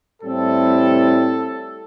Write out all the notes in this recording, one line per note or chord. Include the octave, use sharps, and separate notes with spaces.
A2 G3 C4 E4 A4